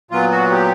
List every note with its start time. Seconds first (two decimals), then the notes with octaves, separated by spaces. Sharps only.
0.11 A#2 F#3 B3 F4
0.31 F#4
0.51 G4